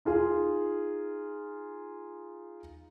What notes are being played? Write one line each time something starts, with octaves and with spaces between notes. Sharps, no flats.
D#4 F4 G#4